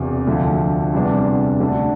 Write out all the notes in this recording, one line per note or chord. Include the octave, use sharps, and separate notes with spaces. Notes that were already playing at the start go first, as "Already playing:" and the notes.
Already playing: E1 E2 C3
D2 D3 F3
E2 C3 G3 B3 D4
D2 D3 A3 D4